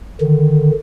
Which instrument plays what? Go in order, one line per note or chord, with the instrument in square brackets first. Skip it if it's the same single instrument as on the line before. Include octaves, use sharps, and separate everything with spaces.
[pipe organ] D3 D#3